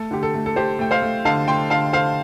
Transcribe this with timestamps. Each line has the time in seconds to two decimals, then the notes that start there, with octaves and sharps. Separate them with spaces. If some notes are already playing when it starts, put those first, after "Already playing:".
Already playing: A3 A4
0.11 D3 G4
0.23 A4
0.34 A3
0.46 A4
0.56 A3 G4 C5
0.79 A3 G5
0.91 C5 F5
1.02 A3
1.25 D3 F5 A5
1.47 A3 G5 C6
1.70 D3 F5 A5
1.93 D3 C5 F5